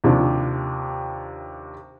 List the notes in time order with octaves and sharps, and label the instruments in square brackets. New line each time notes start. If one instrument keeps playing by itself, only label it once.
[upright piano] D#2 C3 F3 D4